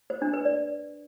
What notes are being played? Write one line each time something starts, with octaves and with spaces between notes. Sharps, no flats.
C5
D4
B4
D5